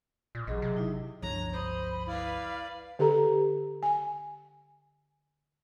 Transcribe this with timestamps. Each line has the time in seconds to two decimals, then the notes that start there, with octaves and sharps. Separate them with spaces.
0.35 A#2
0.47 A1 F#3 G#4 D#5
0.62 C3
0.77 D#4 E4
1.22 G1 C#2 F3 D4 C#5 A#5
1.53 C5 D#5 B5
2.07 E4 B4 D5 F5
2.99 D3 G4 A4 A#5
3.83 G#5